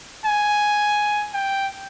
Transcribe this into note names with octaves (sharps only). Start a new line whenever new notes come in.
G#5
G5